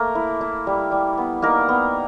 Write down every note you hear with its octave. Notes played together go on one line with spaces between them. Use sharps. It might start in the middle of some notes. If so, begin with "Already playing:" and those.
Already playing: A3 A#3 A#4
E4
E4
G3
G3
B3
A#3 D#4 A#4
B3